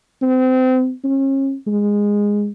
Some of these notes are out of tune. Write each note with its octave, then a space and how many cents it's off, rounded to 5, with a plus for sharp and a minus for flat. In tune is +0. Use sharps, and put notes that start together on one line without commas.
C4 -30
C#4 -35
G#3 -15